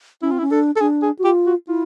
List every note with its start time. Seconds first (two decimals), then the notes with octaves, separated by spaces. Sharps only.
0.22 C#4 E4
0.31 C4 F4
0.38 E4
0.41 C#4
0.51 D4 A4
0.76 A4
0.80 D4 G#4
1.03 G#4
1.19 F#4
1.24 F4 G4
1.46 F#4
1.68 E4 F4